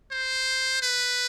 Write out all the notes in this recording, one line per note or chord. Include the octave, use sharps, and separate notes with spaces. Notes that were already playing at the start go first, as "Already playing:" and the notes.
C5
B4